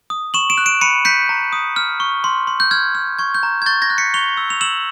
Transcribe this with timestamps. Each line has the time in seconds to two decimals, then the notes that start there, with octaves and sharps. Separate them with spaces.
0.10 D#6
0.34 C#6 E7 F#7
0.50 D7 E7
0.58 F#6
0.66 D7 E7
0.81 B5 C#7 D#7
1.05 G6 B6 C#7
1.29 A#5
1.53 D#6
1.76 F6
2.00 C#6
2.24 C6
2.47 C6
2.60 G6
2.71 F6 G#6
2.95 F6
3.19 C#6 G#6
3.35 G6
3.43 A#5
3.62 G#6
3.66 C#6 G6 A6
3.82 G#6 A#6
3.90 F#6
3.98 B6 C#7
4.14 C#6 F7 G7
4.37 E6
4.50 F7
4.61 E6 E7 F#7